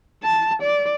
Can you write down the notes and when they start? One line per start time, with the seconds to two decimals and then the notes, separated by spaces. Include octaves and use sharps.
0.23 A5
0.62 D5